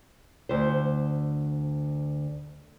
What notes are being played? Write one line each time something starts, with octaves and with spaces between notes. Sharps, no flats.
D2 C5